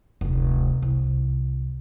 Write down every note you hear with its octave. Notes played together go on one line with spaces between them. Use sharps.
F1 D2
C2